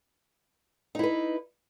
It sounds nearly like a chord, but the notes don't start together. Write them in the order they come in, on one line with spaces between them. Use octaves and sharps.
D#4 E4 B4